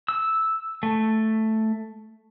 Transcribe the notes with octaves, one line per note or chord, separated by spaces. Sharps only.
E6
A3